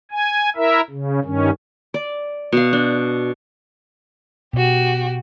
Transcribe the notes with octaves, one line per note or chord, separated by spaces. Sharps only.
G#5
E4 A#4 E5
C#3
G2 D#3 C#4
D5
B2 F5
D4
B2 F#4 G4